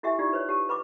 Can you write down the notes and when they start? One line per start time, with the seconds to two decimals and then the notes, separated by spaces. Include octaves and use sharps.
0.03 E4 F#4 G4 E5 G#5
0.19 D#4 F4 G4 D5
0.33 B4 C#5
0.49 G4 A5
0.69 B4 B5 C#6 D6